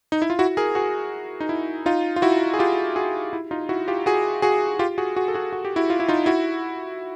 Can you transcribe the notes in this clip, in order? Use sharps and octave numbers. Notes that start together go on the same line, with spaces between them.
D#4
E4
F4
E4 F#4
G#4 A#4
F#4 G#4
D#4
E4
D#4 F4
F4
E4 F#4
G#4
F4 G4
F#4 G#4
E4
D#4 F4
E4 F#4
F4 G4
F#4 G#4
F#4 G#4
F4 G4
F#4 G#4
F#4 G#4
A4
F#4 G#4
F#4
G4
E4 F#4
F4
E4
D#4 F4
E4 F#4